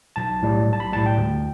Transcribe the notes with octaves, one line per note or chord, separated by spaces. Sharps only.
B1 A5
A2 G3
B1
A5
B5
A2 G3 A5
G5
D2